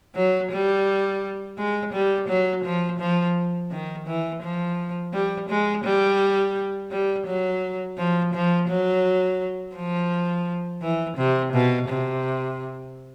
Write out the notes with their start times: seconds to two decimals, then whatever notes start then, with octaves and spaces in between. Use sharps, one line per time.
0.15 F#3
0.52 G3
1.58 G#3
1.93 G3
2.28 F#3
2.64 F3
3.00 F3
3.71 D#3
4.07 E3
4.42 F3
5.13 G3
5.49 G#3
5.84 G3
6.91 G3
7.27 F#3
7.98 F3
8.34 F3
8.69 F#3
9.76 F3
10.82 E3
11.17 C3
11.53 B2
11.89 C3